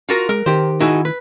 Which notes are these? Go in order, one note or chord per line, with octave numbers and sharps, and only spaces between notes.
F4 F#4 A#4
G#3 A#4
D#3 G4 C5
D#4 E4 F#4 G#4
B4